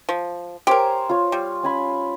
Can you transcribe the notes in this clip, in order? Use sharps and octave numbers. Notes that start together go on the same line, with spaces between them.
F3
G4 A#4 C5 C#5 G#5
F4 C#5
G3
C#4 G#5 B5